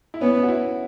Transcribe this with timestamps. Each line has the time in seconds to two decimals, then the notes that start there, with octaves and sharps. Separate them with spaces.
0.14 E4
0.21 B3 C#4
0.43 F#4
0.48 E4